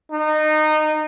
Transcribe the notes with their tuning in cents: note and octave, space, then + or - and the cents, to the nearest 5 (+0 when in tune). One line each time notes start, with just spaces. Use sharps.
D#4 -20